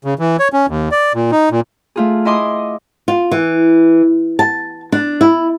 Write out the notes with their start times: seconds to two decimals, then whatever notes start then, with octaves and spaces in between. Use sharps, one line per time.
0.05 C#3
0.19 E3
0.39 C#5
0.53 C#4
0.68 D#2
0.91 D5
1.14 A#2
1.31 D#4
1.51 A#2
1.96 A3 F4 G#4
2.25 E4 D#5 G#5 C6 D6 D#6
3.08 F4
3.31 E3
4.39 A5
4.92 D4
5.21 E4